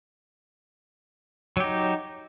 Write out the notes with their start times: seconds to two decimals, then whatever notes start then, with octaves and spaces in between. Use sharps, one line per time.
1.57 F#3
1.60 G4
1.64 D#4